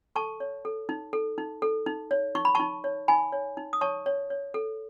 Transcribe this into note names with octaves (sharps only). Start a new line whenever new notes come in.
A4 A5 C#6
C#5
A4
D#4
A4
D#4
A4
D#4
C#5
D#4 C#6
B5
D#4 A5 C#6
C#5
D#4 G#5 B5
C#5
D#4
D#6
C#5 A5 C#6
C#5
C#5
A4